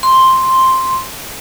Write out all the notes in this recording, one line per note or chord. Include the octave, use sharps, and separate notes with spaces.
C6